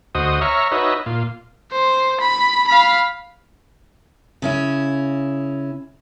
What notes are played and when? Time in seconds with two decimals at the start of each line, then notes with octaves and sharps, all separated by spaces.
0.15 D2 F#4 C5 D#5 D#6
0.41 C#5 E5 A#5 C#6 F6
0.72 D#4 F#4 B4 C#5 D#5 E5
1.06 A#2 F4
1.72 C5
2.21 B5
2.67 F5 B5
4.42 C#3 C#4 E4